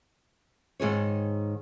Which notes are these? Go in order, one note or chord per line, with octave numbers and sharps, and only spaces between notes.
G#2 D#3 G#4 C#5